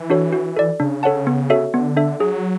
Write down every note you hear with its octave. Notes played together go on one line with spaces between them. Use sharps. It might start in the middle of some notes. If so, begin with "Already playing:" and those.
Already playing: E3
D4 F#4 A4 C#5
F#4
A4 D5
C#3 D4
A4 C#5 F#5 A5
B3
F#4 A4 C#5 E5
D3 B3
D4 A4 E5
F#3 G#4